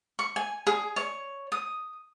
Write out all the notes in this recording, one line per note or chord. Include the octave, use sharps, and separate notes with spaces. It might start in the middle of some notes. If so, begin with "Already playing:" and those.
C#6
G#5
G#4
C#5
D#6